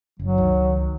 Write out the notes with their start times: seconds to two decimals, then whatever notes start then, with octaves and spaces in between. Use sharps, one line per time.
0.19 F#1 F#3
0.38 C#2 D#3